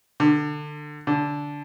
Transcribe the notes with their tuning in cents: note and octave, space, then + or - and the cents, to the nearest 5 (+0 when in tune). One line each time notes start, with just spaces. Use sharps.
D3 +25
D3 -10